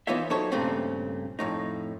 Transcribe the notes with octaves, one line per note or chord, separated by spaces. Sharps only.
E3 B3 D#4 F4 C#5 E5
F#3 D#4 A4 C5 C#5
G2 A#2 C#3 A3 C4 C#4
F2 A2 D#4